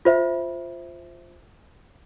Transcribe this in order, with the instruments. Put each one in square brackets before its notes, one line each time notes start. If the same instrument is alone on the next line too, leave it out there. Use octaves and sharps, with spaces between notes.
[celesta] F4 C5 E5